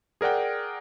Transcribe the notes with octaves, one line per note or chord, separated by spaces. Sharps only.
G#4 A#4 D5 F#5 G5